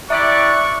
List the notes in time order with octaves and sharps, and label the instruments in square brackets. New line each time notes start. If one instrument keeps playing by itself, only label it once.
[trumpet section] E4 G4 D5 [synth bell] E5 [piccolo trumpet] C#6 [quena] F#6